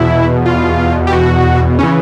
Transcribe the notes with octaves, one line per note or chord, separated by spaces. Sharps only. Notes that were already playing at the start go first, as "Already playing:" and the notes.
Already playing: E2 B2 E4
F4
G4
F#4
C#3 E3 C#4